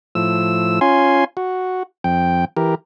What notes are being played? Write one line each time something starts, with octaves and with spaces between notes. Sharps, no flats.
A2 F3 E6
C#4 F4 G#5 C6
F#4
F2 G5
E3 G4 A#4